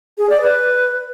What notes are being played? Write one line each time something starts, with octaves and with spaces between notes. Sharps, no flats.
G#4
D5
B4